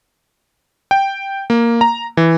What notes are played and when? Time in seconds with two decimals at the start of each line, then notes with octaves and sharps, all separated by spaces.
0.91 G5
1.50 A#3
1.81 A#5
2.17 E3